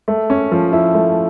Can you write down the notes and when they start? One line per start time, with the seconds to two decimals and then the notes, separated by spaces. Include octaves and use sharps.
0.08 A3
0.30 C#4
0.52 F3
0.73 E4
0.95 A3